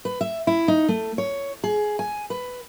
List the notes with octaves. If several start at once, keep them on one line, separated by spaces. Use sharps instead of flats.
B4
E5
E4
D#4
A3
C#5
G#4
G#5
B4